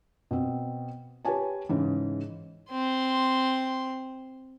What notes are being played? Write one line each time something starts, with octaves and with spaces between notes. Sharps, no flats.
B2 C4
G4 B4 C#5 G#5 A5
G#2 C#3 E3
C4 C6